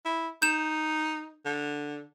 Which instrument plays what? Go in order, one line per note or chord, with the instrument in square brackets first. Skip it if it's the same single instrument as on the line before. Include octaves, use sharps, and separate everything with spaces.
[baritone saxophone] E4
[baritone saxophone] D#4 [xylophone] G6 E7
[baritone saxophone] D3